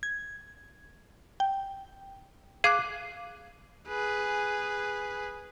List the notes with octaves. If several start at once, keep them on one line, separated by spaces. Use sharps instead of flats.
G#6
G5
G#4 F5 D6 F#6
G#4 B4